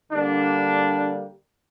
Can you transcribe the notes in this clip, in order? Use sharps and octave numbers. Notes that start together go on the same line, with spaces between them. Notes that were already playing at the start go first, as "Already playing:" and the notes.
D3 G3 A#3 D4